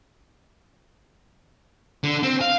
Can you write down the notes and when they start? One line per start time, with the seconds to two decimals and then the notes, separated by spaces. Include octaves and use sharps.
2.04 D3
2.23 C4
2.41 F5